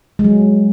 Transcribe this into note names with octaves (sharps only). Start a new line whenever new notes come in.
G#3
F#3